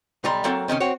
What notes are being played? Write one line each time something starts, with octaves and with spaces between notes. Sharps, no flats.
B1 G3 A#5 C6
F#3 A#3 C4 F#4 A4 F5
C3 D#3 A3 C#4
C4 F#4 C#5